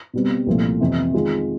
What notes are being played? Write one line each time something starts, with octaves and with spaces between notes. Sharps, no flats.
B2 G3 C4
C2 A#2 F3 A3
F2 C3 E3
D#3 G#3 C4 F4